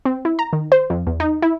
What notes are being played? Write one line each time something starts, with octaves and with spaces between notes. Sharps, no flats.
C4
E4
A#5
D#3
C5
F2
E2
D#4
E4